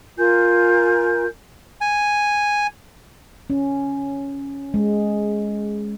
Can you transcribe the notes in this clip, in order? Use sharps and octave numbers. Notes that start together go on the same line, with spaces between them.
F4 A#4 G#5 G6
G#5
C#4
G#3